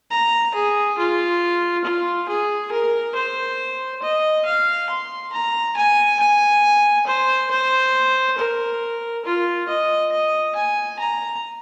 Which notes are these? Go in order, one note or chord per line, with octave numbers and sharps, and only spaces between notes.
A#5
G#4
F4
F4
G#4
A#4
C5
D#5
F5
C6
A#5
G#5
G#5
C5
C5
A#4
F4
D#5
D#5
G#5
A#5